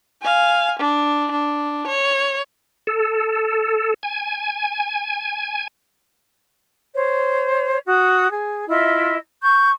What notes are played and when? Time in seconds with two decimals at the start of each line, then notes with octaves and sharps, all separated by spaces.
0.22 F5 G#5
0.79 D4
1.31 D4
1.87 C#5
2.87 A4
4.03 G#5
6.94 C5 C#5
7.86 F#4 D#6
8.31 G#4
8.68 E4 F4 D#5 E5
9.41 C#6 G6